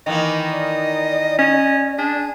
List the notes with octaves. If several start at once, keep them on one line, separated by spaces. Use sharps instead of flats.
D#3 E3 A#3 D#5
D5
C#4 D#5
D4 G#4